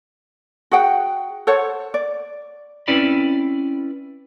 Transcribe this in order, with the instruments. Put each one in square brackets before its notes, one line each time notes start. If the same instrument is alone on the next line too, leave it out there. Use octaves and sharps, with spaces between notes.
[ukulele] F#4 G#4 F#5 G5
A4 C5 C#5 F#5
D5
[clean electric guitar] C4 C#4 E4 B4 D5 B5